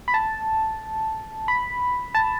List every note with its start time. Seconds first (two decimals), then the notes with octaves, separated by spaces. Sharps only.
0.08 B5
0.14 A5
1.48 B5
2.15 A5